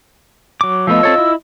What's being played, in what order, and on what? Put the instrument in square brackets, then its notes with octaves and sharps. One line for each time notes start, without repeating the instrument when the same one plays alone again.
[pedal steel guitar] F#3 D6
[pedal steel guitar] F3 A3 B3 [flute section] F4 D#5 E6
[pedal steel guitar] C4 A4 C#5
E4